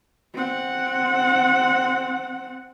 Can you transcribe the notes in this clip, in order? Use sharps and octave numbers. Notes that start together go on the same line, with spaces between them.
C4 F#5